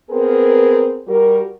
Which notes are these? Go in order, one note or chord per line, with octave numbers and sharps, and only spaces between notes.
B3 C4 G#4 A#4
G3 F#4 G4 A#4